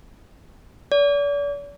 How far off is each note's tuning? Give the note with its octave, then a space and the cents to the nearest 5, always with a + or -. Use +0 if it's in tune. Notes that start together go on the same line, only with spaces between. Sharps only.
D5 -40